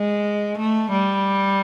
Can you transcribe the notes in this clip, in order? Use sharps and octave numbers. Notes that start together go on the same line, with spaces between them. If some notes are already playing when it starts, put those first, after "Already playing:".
Already playing: G#3
A3
G3